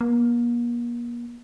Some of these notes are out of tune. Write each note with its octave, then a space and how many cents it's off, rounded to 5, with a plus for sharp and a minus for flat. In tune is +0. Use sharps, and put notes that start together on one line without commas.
A#3 +40